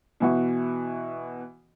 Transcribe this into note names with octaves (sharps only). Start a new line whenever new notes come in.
B2 E3 F#4